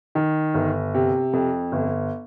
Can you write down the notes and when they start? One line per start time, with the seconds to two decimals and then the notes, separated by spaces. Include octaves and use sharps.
0.15 D#3
0.54 G1
0.94 C3
1.33 F2
1.72 G1